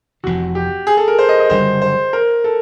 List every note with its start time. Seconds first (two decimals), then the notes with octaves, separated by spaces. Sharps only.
0.23 F1 F2 C3 E3 F#4
0.55 G4
0.87 G#4
0.97 A4
1.08 A#4
1.19 C5
1.29 D#5
1.40 D#5
1.50 F#1 F#2 D3 G3 C5
1.82 C5
2.13 A#4
2.44 A4